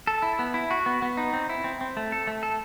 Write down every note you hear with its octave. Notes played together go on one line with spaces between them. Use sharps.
A4
E4
B3
E4
F#4
B3
B3
D#4
C4
E4
C4
C4
A3
A4
A3
A4